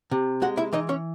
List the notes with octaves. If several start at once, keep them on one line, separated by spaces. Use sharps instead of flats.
C3
G#3 F#4 F#5
E4 E5
E3 D#4 D#5
C#4 C#5